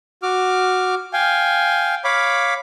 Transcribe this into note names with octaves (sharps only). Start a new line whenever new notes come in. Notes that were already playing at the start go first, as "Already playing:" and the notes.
F#4 D6 F6
F5 G5 G#5
C#5 F5 B5 D6